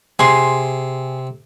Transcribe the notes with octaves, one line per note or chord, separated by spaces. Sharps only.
C3 G#4 C6